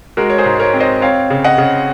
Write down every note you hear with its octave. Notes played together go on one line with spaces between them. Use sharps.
G#3 F#4 A#4
C#5
G#4 C5
G#2
A#4 C#5
C4
C5 D#5
C4 C#5 F5
C#3
D#5 F#5
C#3